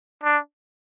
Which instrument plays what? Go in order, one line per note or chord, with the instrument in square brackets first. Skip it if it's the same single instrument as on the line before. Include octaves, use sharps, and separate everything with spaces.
[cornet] D4